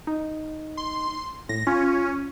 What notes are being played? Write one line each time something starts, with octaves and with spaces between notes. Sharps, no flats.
D#4
C6
A2 A#6
C#4 F4